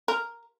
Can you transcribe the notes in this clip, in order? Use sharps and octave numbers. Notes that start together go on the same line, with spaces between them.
A#4